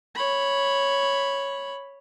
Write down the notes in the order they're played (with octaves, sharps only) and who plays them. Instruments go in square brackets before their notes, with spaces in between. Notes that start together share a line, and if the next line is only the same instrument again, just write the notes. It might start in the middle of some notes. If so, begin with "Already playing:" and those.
[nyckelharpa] C#5 B5